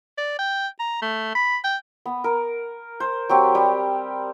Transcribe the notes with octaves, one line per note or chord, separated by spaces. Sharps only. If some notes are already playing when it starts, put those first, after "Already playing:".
D5
G5
A#5
A3
B5
G5
B3
A#4
C5
F#3 C4 G4
G3